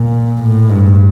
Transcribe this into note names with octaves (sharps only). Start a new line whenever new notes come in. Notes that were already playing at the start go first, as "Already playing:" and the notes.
Already playing: A#2
A2
G2